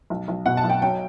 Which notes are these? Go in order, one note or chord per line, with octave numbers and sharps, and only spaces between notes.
B1
B1
B2 F#5
A5
B1
G5
F#3 G5